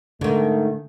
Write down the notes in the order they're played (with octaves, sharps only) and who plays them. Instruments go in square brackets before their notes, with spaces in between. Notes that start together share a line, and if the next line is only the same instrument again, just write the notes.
[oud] G#2 D#3 [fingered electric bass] D3 [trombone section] A3